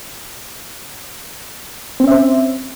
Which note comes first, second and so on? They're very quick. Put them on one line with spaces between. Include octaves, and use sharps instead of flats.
C4 C#4 E5 C5